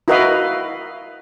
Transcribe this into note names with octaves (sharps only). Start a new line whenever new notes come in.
E4 F#4 A#4 B4 D#5 F5